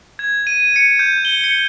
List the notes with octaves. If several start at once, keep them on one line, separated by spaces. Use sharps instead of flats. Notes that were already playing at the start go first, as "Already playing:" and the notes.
G#6
D#7
C#7
G6
G7
C#7